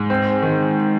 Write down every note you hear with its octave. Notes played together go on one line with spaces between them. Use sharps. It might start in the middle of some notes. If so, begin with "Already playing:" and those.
Already playing: G#2
C4
D#3